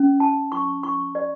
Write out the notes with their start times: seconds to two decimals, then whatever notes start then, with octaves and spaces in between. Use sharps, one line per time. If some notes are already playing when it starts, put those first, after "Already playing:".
Already playing: C#4
0.20 A5
0.52 C#6
0.83 C#6
1.15 D5